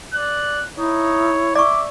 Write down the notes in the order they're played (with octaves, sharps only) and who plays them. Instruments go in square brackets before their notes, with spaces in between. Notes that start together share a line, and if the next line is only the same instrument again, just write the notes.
[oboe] D5 [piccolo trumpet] F#6
[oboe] D#4 [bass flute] E4 [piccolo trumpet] C#5
[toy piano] D5 C#6 [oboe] E5 [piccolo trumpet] D6